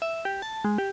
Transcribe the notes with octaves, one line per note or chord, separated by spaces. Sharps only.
E5
G4
A5
G#3
G4